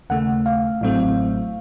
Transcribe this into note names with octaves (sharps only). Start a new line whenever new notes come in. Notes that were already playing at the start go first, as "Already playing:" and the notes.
D#2 C#3 A3 F#5
F5
A1 A2 F#3 A3 C4